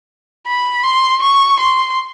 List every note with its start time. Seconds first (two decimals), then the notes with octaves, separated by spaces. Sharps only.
0.47 B5
0.84 C6
1.22 C#6
1.60 C6